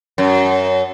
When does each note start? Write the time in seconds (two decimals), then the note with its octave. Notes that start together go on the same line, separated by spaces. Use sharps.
0.18 F#2